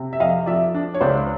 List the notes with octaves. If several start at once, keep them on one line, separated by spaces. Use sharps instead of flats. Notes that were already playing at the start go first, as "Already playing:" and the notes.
Already playing: C3
E5
F2 D#5 F5
F3 D5 E5
D4
C#5
C#2 C5 D5